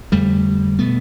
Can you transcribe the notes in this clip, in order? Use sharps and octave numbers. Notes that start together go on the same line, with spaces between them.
F2 D3 G3 A3
B2 A3 B3